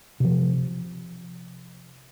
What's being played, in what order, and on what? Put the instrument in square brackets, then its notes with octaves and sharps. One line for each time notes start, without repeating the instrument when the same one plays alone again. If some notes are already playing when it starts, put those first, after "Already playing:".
[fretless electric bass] C3 F3